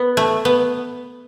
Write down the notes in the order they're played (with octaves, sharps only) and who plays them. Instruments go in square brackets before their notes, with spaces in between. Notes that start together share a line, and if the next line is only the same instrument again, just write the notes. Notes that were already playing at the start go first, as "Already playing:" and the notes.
Already playing: [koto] B3
A3
B3